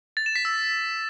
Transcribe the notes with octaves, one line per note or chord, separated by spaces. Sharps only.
A6
E7
B6
E6